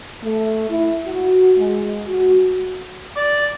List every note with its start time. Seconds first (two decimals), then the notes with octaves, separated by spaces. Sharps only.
0.22 A3
0.69 E4
1.05 F#4
1.57 G#3
2.07 F#4
3.16 D5